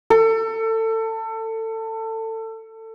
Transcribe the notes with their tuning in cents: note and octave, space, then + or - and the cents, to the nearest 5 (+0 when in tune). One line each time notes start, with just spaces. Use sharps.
A4 +25